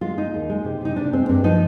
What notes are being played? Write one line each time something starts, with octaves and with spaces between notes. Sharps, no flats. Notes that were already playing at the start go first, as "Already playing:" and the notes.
G#3 F4
G#3 D#4
D#2
G#3
C3
C3 D#4
C3 D4
G#3 C4
G2 D4
F3 D#4